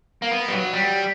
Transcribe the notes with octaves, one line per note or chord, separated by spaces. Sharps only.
A#3
B3
G3
F#3
G3